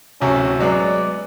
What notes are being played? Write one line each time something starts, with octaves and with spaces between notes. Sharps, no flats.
D1 C3 C#4 F#4
F#3 G#3 B3 D5